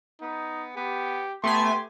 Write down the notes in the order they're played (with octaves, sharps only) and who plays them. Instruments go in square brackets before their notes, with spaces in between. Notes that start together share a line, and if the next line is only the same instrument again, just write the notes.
[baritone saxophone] B3 [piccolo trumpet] D#4
[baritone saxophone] B3 [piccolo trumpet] G4
[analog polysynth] A3 B3 G#5 [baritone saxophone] G4 [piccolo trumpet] C6